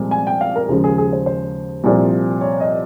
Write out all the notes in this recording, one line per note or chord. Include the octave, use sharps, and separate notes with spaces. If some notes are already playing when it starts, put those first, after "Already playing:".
Already playing: C2 A#2 F3 G#3
G#5
G5
F5
A#4
D#2 C#3 F3 G#3
G#4
G#4
C5
C5
C2 A#2 F3
C#5
D#5